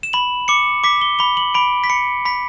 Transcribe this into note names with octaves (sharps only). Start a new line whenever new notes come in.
E7
B5 F#7
D6 C#7
D6 B6
G7
B5 G7
F#7
B5 D7
B6
B5 C#7
B5 B6